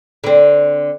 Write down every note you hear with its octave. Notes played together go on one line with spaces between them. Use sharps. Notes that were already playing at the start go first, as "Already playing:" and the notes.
D3 C4